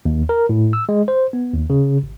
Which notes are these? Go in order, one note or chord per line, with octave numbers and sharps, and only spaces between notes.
D#2
A#4
A2
E6
G#3
C5
B3
D#2
C#3
G#1